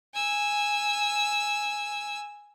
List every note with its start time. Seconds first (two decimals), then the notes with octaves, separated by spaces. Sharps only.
0.14 G#5 E6